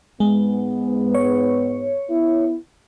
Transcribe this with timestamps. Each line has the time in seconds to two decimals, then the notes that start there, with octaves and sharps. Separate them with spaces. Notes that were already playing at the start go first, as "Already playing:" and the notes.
0.20 G#2 G#3 B3
1.14 C#5
2.10 B3 E4